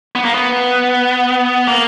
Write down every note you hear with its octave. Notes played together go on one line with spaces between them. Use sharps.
B3
A#3
B3
A#3